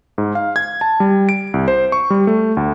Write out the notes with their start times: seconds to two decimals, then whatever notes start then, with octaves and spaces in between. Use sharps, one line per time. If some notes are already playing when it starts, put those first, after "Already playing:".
0.18 G#2
0.35 F5
0.56 G#6
0.81 A5
1.00 G3
1.29 D7
1.54 C2
1.68 C5
1.92 C#6
2.10 G3
2.27 A3
2.57 D2